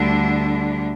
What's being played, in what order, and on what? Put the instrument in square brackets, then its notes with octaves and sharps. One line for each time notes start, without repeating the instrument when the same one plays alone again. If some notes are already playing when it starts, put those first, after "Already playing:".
Already playing: [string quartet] D2 D3 G3 D4